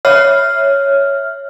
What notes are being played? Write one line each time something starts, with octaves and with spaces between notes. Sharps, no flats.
C#5 E5 F6